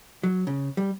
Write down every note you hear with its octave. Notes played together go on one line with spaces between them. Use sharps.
F#3
C#3
G3